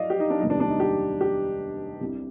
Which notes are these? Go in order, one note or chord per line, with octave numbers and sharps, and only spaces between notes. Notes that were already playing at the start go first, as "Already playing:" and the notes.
Already playing: D5 D#5 F5
G4
D#4
D4
F1 D#2 D#3 G3 D#4
D4
D4
D#4
G4
G4
C2 C3 G3